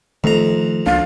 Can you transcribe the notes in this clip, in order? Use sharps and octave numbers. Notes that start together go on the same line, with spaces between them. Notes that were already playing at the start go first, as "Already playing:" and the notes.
F2 D#3 A3 A#5
C#2 A#3 D4 F5